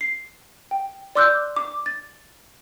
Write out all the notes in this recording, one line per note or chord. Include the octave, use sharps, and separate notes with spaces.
C7
G5
D5 C6 D6 E6 F#6 G6
D6
A6